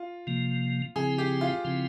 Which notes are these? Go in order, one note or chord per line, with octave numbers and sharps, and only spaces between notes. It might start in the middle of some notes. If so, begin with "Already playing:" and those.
Already playing: F4
C3 F3 A#3
C#3 F3 C4 E4 G#4
G4
F4
C#3 F3 C4 E4